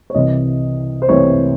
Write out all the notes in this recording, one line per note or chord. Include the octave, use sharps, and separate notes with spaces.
C#5
C2 C3 E3 D#5
C5
C2 C3 E3 C#5